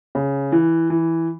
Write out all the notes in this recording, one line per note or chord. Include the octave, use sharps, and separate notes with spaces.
C#3
E3
E3